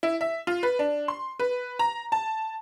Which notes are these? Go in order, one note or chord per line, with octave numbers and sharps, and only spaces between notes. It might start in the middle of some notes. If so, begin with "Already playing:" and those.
E4
E5
F4
B4
D4
C6
B4
A#5
A5